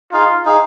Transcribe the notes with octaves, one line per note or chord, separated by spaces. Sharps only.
D#4 F4 G#4 F5
D#4 G#4 F5